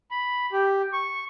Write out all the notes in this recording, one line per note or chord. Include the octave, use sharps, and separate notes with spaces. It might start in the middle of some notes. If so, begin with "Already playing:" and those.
B5
G4
C#6